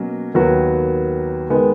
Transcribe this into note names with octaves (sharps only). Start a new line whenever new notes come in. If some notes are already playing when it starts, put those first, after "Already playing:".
Already playing: B2 F#3 A#3 C#4
D#2 D#3 F#3 B3 F#4
D#3 G#3 B3